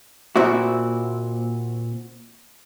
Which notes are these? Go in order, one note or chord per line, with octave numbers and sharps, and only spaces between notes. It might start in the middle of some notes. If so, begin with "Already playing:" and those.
A#2 C4 E4 F#4